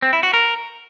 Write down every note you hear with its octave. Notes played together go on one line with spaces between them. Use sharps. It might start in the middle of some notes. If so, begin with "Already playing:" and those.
C4
E4
F#4
A#4